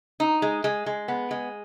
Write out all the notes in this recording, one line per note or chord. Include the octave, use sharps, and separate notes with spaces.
D#4
G#3
G#3
G#3
B3
G#3